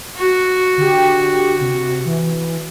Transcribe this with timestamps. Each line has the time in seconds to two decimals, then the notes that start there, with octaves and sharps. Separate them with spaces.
0.16 F#4
0.77 D3 G4
1.61 C3
2.05 E3